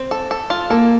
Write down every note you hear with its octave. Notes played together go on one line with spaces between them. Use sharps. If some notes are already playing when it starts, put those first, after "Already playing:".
Already playing: C4
A4
A4
F4
A#3 A4